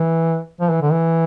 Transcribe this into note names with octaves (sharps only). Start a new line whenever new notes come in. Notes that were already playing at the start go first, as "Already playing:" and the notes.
Already playing: E3
F3
E3
D3
E3